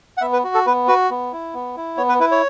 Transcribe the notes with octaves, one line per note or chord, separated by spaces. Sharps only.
F#5
B3 E5
B4
F#4
A4
B3 B4
F#4 B4
B3
E4
B3
E4
B3 C#5
B4
E4 B4
C#5